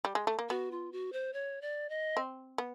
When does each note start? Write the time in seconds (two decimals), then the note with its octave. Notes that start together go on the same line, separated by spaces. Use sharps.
0.05 G3
0.15 G#3
0.27 A3
0.39 A#3
0.49 B3 F#4
0.71 F4
0.92 F#4
1.13 C5
1.33 C#5
1.62 D5
1.89 D#5
2.17 C4
2.58 B3